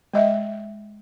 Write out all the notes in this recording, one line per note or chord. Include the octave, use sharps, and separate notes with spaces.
G#3 D#5 E5